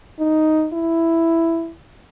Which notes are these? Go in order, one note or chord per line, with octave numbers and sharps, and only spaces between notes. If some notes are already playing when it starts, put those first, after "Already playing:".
D#4
E4